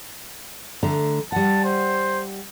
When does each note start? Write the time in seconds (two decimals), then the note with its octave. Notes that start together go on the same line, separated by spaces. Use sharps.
0.83 D3 A3 A#5
1.32 G3 F#5 A5
1.64 C5